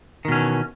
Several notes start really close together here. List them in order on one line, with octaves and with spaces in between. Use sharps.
D#3 B2 C#4 E3